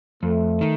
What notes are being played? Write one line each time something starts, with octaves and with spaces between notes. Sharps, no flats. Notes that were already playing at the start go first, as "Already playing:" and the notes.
F2 A3
D#3